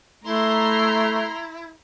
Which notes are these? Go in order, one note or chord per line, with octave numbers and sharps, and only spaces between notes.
A3 E4 A#5 C6